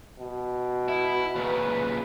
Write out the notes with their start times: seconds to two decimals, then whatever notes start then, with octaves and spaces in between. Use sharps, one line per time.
0.18 B2
0.88 E4
1.35 A#2 C#3 B4